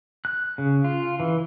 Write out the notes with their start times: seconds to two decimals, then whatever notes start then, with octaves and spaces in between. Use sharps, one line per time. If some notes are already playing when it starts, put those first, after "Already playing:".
0.25 F#6
0.58 C#3
0.84 F4
1.20 E3